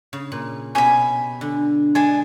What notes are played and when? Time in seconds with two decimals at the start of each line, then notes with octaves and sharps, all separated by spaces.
0.13 C#3
0.32 A#2
0.75 B2 C#4 G4 G#5 B5
1.41 D3
1.95 G#3 D4 G#5